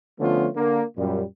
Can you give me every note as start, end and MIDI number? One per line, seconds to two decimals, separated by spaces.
0.20 0.48 50
0.20 0.48 53
0.20 0.48 57
0.20 0.48 59
0.20 0.48 61
0.20 0.48 65
0.56 0.83 50
0.56 0.83 58
0.98 1.23 42
0.98 1.23 46
0.98 1.23 55